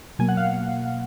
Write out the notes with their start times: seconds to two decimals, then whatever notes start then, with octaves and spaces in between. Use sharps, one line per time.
0.19 B2 F#3 A#3 G#5
0.28 F#5
0.37 F5